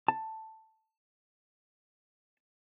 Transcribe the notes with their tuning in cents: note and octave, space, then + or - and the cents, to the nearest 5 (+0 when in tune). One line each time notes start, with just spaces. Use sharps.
A5 +5